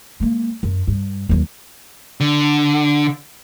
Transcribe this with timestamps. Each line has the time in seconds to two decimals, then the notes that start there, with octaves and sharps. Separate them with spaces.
0.20 G#3 A#3
0.63 F#2
0.87 G2
1.29 D#2 F#3
2.20 D3